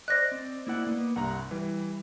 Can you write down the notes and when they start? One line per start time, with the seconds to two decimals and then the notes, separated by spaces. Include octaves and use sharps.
0.08 C5 D5 D#5 F#6 A#6
0.32 C4
0.67 A#3 E4 F#5
0.87 A#3 B3
1.16 C2 G2 F#5 A#5
1.51 E3 G3